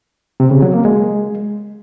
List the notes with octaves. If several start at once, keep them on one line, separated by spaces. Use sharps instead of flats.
C3
C#3
F#3
A#3
G#3